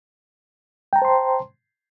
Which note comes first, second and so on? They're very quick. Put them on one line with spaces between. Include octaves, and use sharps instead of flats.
G5 A#5 A5 C5 C6